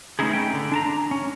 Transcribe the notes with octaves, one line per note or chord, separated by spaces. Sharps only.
A3 B3 C#4 D#4 E4 G#4
C#4 G5
D3
D4 A5 A#5
C#4